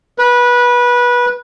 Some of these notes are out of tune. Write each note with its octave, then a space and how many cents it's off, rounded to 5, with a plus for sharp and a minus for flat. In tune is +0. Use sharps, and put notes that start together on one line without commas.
B4 -20